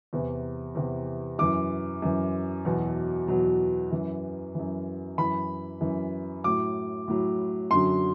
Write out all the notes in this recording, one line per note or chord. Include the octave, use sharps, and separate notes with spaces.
E2 C3 E3
E2 C3 E3
F#2 E3 D6
F#2 E3
E2 B2 F#3
E2 B2 F#3
F#2 E3
F#2 E3
F#2 E3 B5
F#2 E3
A2 F#3 D6
A2 F#3
F#2 D3 F#3 C6